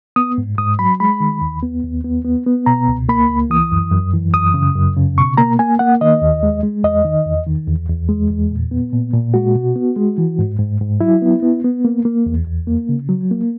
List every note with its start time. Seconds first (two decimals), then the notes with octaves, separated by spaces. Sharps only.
0.16 B3 D#6
0.38 G#2
0.58 G#2 D#6
0.79 F#3 B5
1.00 G#3 B5
1.20 D#3
1.42 D#2
1.63 B3
1.84 D#2
2.04 B3
2.25 B3
2.46 B3
2.66 B2 A#5
2.88 C#2
3.09 A#3 B5
3.29 C#2
3.50 E3 D#6
3.72 F#2
3.92 F#2
4.14 E3
4.34 F#2 D#6
4.54 C#3
4.75 F#2
4.97 C#3
5.18 B2 C#6
5.37 A#3 A#5
5.59 A#3 G#5
5.79 A#3 F#5
6.01 D#3 D#5
6.22 D#2
6.43 G#3
6.63 G#3
6.84 E2 D#5
7.05 D#3
7.26 E2
7.47 D#3
7.68 E2
7.89 E2
8.09 G#3
8.31 E2
8.51 A#2
8.71 B3
8.93 A#2
9.13 A#2
9.34 G#3 F#4
9.55 B2
9.76 B3
9.96 G#3
10.18 E3
10.39 G#2
10.59 G#2
10.81 G#2
11.01 F#3 E4
11.22 B3
11.43 B3
11.64 B3
11.85 A#3
12.05 A#3
12.26 E2
12.47 E2
12.67 A#3
12.89 C#3
13.09 F#3
13.31 A#3